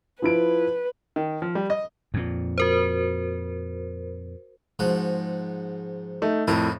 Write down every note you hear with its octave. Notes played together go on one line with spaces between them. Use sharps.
F3 E4 B4 D7
D#3
F3
G3
D#5
F2 A#2
F#4 A#4 C5
G#2 F3 F#4
A3 D#4
F2 A2 E4 F4 A#4